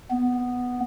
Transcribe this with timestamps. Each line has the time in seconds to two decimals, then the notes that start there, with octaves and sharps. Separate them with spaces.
0.11 B3